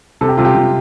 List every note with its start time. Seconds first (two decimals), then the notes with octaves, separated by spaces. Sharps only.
0.21 C3 A4
0.29 G4
0.37 C3 F4
0.45 G4
0.55 C3